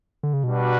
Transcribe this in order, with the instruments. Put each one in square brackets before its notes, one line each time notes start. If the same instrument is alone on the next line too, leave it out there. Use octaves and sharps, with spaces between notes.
[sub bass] D3
C#3
[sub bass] B2 [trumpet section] G3 D4 F#4 B4